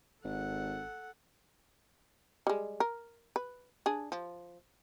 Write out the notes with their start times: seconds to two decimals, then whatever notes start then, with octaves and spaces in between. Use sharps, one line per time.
0.24 G#1 A4 F#5
2.47 G3 G#3
2.80 A#4
3.36 B4
3.86 D4 G#4
4.12 F3